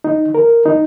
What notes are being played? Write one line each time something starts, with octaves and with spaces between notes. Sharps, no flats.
D#4
A#4
D#4